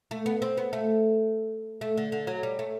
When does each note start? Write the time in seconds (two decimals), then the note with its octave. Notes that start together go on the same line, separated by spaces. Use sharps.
0.11 A3
0.26 B3
0.42 C4
0.57 B3
0.73 A3
1.81 A3
1.97 D3
2.12 D3
2.27 F#3
2.43 G3
2.59 A3